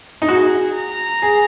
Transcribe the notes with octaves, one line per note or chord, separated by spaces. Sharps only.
D#4
F#4 G#4
A#5
G#4